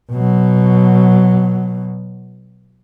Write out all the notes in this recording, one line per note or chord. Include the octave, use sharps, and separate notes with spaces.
B2 F#3